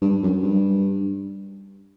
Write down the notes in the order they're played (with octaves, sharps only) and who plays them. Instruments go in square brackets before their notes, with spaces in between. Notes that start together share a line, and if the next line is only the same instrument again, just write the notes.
[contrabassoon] G2
F#2
G2